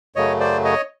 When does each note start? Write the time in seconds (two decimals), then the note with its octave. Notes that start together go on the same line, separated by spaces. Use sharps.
0.16 F#2 C#3 F#3 A3 C#5 D#5
0.40 C5 D5
0.64 C#5 D#5